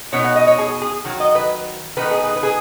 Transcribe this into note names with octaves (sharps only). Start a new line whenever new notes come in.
B2 B3 D#4 C#5
F#5
D#5
C#5
G#4
G#4
D#3 F#3
D#5
B4
D#3 B3 D#4 B4
G#4
B4
B4
G#4